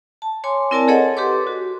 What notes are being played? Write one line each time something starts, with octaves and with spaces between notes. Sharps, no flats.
A5
C#5 G#5 C6 D6
C4 E4 A#4 D5 G#5 A5
G#4 A4 C#5 D#5 F#5
G4 A4 B4 C6 D6
F#4